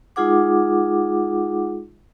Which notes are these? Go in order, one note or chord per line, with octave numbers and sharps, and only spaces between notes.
G#3 D#4 F4 G#4 F#5 D6